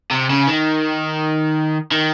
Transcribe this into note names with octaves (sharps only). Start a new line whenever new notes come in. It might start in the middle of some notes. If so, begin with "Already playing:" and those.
C3
C#3
D#3
D#3